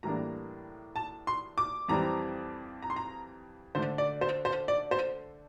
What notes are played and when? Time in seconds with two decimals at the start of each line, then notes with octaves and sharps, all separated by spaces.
0.03 A2 E3 G3 A#3 D4 A#5
0.96 A5
1.27 C6
1.58 D6
1.88 F2 E3 G3 C4 A#5
2.82 A#5
2.90 C6
2.96 A#5
3.75 D3 A3 D4 C5
3.98 D5
4.21 C5
4.45 C5
4.68 D5
4.91 C5